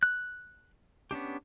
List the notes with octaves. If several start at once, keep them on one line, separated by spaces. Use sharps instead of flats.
F#6
B3 C#4 D4 G4